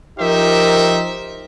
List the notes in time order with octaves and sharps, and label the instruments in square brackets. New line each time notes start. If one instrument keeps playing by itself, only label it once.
[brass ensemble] F3 D#4 G4 A#4 C5 E5